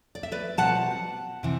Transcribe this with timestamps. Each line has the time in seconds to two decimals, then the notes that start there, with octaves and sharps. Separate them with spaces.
0.15 D5
0.23 E5
0.32 B4 D5
0.57 B2 G3 C4 F#5 A5
1.43 C3 E3